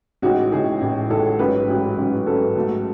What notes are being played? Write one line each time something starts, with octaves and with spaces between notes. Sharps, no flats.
A1 A2 G#3 D#4 F#4
A1 A2 G#3 D#4 G#4
A1 A2 G#3 D#4
A1 A2 G#3 D#4 A4
A1 G#2 F#3 C#4 B4
A1 G#2 F#3 C#4
A1 G#2 F#3 C#4
A1 G#2 F#3 C#4 A4
G#2 F#3 A3